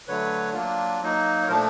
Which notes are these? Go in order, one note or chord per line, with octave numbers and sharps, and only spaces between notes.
D3 F#3 A3 B4 C#5
F#3 A#3 D4 F4
F#3 A#3 D#4
C#5
A#2 F3 A3 D4 A#4 C5